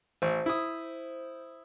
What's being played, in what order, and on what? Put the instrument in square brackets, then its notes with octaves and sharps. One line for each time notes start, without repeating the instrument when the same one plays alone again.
[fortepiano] A1 [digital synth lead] C5
[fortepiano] E4 D#6